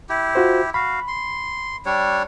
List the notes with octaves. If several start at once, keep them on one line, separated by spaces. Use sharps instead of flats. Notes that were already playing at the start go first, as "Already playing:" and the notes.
E4 G4
F4 F#4 C5
F#4 F5 B5
C6
G3 D4 C#5